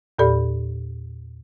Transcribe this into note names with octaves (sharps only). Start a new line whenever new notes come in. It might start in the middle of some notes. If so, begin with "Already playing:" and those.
E2 A#2 G4 A4 D5 B5